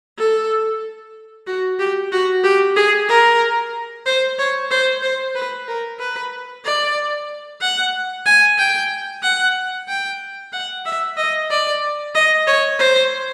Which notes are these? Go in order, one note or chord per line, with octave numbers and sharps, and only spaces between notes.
A4
F#4
G4
F#4
G4
G#4
A#4
C5
C#5
C5
C5
B4
A#4
B4
D5
F#5
G#5
G5
F#5
G5
F#5
E5
D#5
D5
D#5
C#5
C5